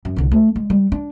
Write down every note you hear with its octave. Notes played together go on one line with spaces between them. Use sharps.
F#2
C2 D3
A3
G#3
G3
D4